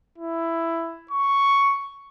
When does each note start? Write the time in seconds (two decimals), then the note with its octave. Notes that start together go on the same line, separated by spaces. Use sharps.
0.18 E4
1.11 C#6